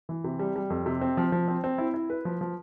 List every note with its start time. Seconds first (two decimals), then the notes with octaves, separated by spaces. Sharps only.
0.09 E3
0.24 C3
0.39 G3
0.56 G3
0.70 F2
0.86 C3
1.01 C4
1.17 F3
1.32 F3
1.48 C4
1.64 C4
1.78 E4
1.94 E4
2.10 B4
2.25 F3
2.41 F3